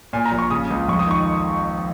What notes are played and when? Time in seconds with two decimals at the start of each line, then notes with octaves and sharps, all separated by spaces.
0.13 A#2 G#5
0.26 A#5
0.31 A#1
0.39 C#6
0.50 C#3 D#6
0.70 C#2
0.88 F2 C#6
0.99 D#6
1.07 D#3 C#6